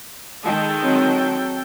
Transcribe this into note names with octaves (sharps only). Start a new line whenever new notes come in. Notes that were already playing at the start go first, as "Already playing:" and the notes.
D#3 G#3 A4 G5
F#3 C4